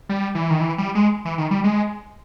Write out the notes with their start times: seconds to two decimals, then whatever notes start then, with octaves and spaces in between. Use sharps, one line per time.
0.09 G3
0.35 E3
0.50 D#3
0.61 E3
0.78 G3
0.95 G#3
1.25 E3
1.38 D#3
1.51 G3
1.64 G#3